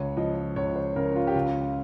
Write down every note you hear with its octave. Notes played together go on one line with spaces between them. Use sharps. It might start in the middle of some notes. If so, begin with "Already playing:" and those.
Already playing: C#2 C#5
F3 D#5
C#2 C#5
C5
C#3 A#4
F4
G4
C#2 F4